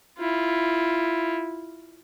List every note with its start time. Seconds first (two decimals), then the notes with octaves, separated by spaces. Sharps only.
0.18 E4 F4